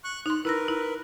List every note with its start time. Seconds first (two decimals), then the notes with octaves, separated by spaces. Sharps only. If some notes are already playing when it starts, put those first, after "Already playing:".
0.04 C#6 F#6
0.26 D#4 C6 F#6
0.45 E4 A#4 B4 E6 A#6
0.68 E4